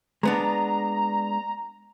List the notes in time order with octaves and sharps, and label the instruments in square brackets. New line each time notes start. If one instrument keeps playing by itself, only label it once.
[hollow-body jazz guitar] G#3 B3 D4 [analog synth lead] A#5